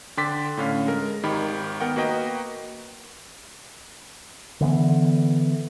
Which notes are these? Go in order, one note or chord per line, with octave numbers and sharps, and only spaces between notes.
D3 G5 C6 D6 A6 B6
A2 D3 C#4 F5
G#3 A#4
G#1 D#3 G4 B5
B3 A#4 F#5 G5
A#3 F#4 B4 D#5 G5 A#5
D3 E3 B3